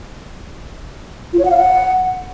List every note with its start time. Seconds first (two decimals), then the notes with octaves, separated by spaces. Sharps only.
1.33 F4
1.39 C#5
1.45 F#5
1.51 F5
1.57 F#5